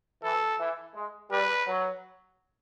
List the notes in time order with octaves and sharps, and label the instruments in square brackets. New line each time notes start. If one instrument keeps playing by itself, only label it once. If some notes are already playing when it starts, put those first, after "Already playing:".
[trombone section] E3 [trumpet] A4
[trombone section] E3
G#3
[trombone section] G3 [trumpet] B4
[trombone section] F#3